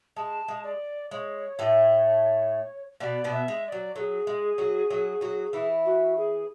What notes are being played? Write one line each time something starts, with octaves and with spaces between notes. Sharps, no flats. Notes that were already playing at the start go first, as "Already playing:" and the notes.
G#3 A5
G#3
D5
G#3 C#5
A2 A3
B2 B3 D5
B2 B3
E5
G#3
E5
F#3 D5
F#3 G#4 A4
G#3
F#3 F#4
F#3 F#4
F#3 F#4
E3 E4
F#4
G#4